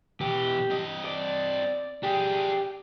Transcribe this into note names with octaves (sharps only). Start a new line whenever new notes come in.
B2 E3 G4
C4 D#5
D5
D4 G4 G#4